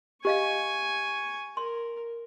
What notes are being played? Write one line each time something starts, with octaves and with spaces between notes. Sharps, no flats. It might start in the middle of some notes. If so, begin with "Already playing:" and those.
G4 D#5 F5 G#5 C#6
A#4 C6